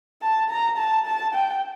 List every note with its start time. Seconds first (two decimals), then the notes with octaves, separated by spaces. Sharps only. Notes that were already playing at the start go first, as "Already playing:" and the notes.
0.22 A5
0.50 A#5
0.77 A5
1.06 A5
1.34 G5